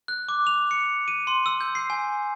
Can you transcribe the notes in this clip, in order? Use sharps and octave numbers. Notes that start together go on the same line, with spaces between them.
F#6
D6
F7
C#7
D#7
C6
E6
G6
C7
G#5